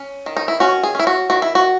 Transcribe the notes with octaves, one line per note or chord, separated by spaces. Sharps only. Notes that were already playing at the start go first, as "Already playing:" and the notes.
Already playing: C#4
D#3
D#4
E4
C#4 F#4
G#4
C#4 E4
F#4
D#3 F#4
E4
F#4